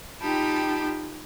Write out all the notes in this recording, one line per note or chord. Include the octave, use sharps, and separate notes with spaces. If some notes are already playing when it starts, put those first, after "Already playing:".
D#4 F4 G4 G5 A5 B5